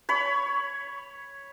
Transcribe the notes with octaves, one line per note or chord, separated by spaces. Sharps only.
C#5 B5